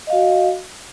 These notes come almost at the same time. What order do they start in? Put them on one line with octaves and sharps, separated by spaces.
D#5 F5 F#4